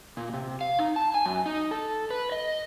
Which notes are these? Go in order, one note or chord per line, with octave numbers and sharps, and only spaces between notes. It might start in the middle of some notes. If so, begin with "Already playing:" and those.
A#2
C3
F5
D#4
A5
G#5
F#2
D#4
A4
B4
D#5